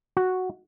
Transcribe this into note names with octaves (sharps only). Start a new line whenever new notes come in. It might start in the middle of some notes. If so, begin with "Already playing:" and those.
F#4